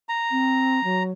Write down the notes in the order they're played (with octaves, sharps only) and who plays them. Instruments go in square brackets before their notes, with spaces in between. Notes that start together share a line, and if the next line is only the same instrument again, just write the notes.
[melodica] A#5
[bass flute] C4
F#3